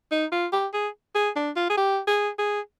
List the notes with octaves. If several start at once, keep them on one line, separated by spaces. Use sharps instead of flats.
D#4
F4
G4
G#4
G#4
D4
F4
G#4
G4
G#4
G#4